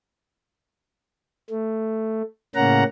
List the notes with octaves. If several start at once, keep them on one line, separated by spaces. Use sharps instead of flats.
A3
A2 C#3 A#3 C#4 F#5 A#5